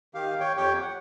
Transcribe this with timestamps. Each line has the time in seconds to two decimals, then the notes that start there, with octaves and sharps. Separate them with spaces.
0.14 D#3 G4 F5
0.40 C#5 G5
0.57 F2 G4 C#5 G5
0.81 F#5